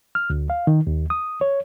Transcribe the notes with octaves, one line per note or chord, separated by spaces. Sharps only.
F6
D2
F5
D#3
D#2
D#6
C#5